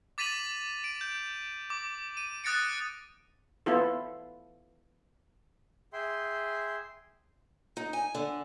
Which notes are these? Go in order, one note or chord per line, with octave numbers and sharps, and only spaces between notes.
D6 A6 B6 D#7 F7 F#7
D7
G6
D6
D#7
D#6 F#6 A6 A#6 C#7 D7
B3 E4 F4 A4
G#4 E5 G5 C6
D#4
G#5
D3